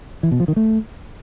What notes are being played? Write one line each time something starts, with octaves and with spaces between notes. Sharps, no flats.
E3
B2
F3
D#3
A3